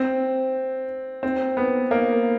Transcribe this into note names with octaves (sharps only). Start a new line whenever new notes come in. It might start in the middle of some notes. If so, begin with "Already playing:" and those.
Already playing: C4
C4
B3
A#3